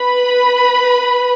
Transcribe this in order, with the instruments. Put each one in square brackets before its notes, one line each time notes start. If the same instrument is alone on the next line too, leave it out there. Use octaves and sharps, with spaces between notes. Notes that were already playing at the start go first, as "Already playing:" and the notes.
Already playing: [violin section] B4 B5